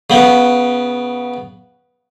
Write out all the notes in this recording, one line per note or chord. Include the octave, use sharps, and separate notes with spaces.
C#3 B3